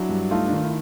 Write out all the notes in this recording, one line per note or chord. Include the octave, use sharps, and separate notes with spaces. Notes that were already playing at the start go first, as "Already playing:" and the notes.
Already playing: F#3 D4 E4
G2
A3 D#4 F4
D4
D#3 D#4
E4